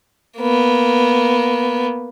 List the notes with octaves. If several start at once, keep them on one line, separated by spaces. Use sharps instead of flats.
A#3 B3